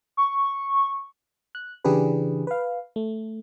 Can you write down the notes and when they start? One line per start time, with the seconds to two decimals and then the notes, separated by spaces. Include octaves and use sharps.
0.17 C#6
1.55 F#6
1.85 C#3 E3 D4 G4 G#4 B4
2.47 B4 F5
2.96 A3